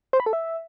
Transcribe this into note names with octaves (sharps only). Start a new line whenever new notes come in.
C5
B5
A4
E5